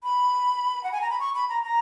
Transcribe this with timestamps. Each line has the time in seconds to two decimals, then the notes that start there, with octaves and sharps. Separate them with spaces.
0.03 B5
0.84 F#5
0.92 G#5
1.02 A#5
1.10 B5
1.20 C#6
1.35 B5
1.49 A#5
1.64 A#5